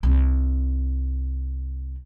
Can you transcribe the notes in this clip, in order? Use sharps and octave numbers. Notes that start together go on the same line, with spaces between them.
C2 C4